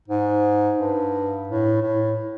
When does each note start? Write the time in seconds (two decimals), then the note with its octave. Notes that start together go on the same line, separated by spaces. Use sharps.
0.08 G#2
0.78 G2
1.48 A2
1.82 A2